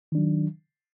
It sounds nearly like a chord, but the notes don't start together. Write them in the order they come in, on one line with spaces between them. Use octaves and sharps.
D#3 D4 F#3